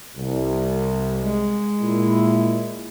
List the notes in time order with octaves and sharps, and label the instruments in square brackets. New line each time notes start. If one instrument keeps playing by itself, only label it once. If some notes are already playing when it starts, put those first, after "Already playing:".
[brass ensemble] C2
[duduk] G#3
[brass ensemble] A#2 E4